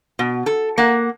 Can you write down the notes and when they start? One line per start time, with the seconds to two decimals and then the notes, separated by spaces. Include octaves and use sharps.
0.19 B2
0.46 A4
0.78 A#3 F#5